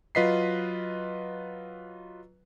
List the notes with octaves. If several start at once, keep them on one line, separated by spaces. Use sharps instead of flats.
F#3 F4 B4 D#5 B6 C7